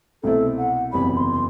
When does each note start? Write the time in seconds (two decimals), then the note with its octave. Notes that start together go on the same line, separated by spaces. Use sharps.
0.23 C2 B2 A3 C4 E4 A4
0.58 F#5
0.93 F#1 E2 C3 G3 B5
1.16 C6
1.32 C6